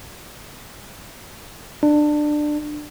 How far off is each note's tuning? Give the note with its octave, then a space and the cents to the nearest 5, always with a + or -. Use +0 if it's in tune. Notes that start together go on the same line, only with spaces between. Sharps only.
D4 +20